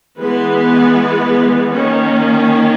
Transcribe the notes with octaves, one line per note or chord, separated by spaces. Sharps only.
E3 G#3 B3 B4
D#3 A#3 C#4